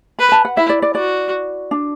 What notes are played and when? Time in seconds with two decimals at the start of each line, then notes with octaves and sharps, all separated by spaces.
0.19 B4 B5
0.32 A5
0.45 F#5
0.57 E4 E5
0.69 D5
0.82 D5
0.95 F#4 D5
1.71 D4